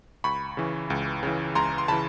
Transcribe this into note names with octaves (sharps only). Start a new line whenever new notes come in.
C#2 B5 C#6
C#3 E3
C#2
C#3 E3
C#2 A#5 C6
C6
C#3 E3 A5 B5